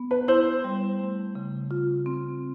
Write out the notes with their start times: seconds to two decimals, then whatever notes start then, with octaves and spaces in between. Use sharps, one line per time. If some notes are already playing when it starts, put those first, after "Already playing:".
Already playing: B3
0.11 B4
0.28 E4 C5
0.64 G3
0.99 A3
1.35 C#3
1.71 F4
2.06 C4